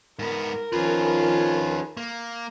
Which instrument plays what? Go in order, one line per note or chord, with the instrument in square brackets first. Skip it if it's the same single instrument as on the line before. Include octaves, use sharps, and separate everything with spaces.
[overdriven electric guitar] G#2 B3 [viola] A#4
[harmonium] D#3 F3 C#4 [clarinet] F4 [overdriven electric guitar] G#4 B4
[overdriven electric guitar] A#3